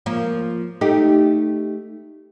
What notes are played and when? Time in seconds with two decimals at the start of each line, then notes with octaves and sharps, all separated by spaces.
0.06 F3 A#3
0.81 A3 D#4 G4